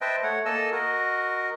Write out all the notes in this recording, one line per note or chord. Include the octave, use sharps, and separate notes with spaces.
B4 C5 D#5 E5 G5 A5
A3 C#5 F#5
A#3 A4 D#5 G#5 A5 E6
F#4 A#4 D#5